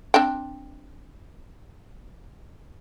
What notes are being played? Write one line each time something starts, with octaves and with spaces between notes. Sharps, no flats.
C4 D4 G5